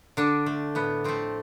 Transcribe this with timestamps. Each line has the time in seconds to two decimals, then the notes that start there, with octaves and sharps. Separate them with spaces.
0.17 D3 D4
0.46 A3
0.75 A2 B3
1.04 F3 A3 C4